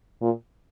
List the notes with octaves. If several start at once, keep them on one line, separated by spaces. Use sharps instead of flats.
A#2